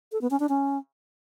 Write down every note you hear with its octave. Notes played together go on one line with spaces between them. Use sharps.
A4
B3
C#4
D4
C#4